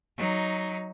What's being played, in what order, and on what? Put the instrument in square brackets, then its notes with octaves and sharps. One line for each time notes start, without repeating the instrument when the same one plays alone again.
[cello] F#3 D#4